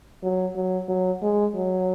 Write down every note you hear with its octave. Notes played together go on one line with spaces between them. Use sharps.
F#3
F#3
F#3
G#3
F#3